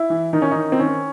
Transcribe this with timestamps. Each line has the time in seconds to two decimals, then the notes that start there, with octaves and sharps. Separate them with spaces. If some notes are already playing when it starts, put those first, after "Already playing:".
Already playing: E4
0.10 E3
0.33 D#3 D#4
0.42 C#4
0.51 D#3 D#4
0.72 C4
0.79 D#3 C#4